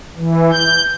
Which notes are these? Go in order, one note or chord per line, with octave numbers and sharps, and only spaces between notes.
E3
G6